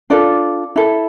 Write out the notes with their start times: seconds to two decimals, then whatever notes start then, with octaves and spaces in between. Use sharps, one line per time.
0.10 D4 F4 A4 D5
0.76 E4 A4